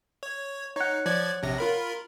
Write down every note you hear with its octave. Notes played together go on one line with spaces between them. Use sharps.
C#5
D#4 C#5 F#5
F3 D5 G#6
A#1 C3 A#6
F4 A#4 B5